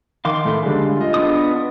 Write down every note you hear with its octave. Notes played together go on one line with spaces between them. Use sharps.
D#3 F5 C6 D6
A2 A3
D3 G3 G#3
F4 D#5
B3 D4 D#6